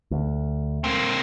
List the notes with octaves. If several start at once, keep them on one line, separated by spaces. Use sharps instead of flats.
D2
A#3 C4